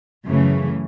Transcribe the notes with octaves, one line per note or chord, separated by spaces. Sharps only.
F#2 C#3 E3 A3